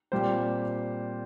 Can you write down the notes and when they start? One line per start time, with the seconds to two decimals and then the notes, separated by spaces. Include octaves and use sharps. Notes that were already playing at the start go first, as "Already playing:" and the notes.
0.12 A#2 G3 C4 G4 C5